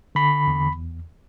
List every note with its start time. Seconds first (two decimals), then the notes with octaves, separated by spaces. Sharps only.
0.15 D3 B5
0.47 E2